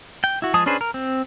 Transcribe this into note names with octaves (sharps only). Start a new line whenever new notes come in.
G5
E4 F#4
F3 G#3 G#4 A5 D#6
C#4 D4 G#4 B4 C5
A#4
C4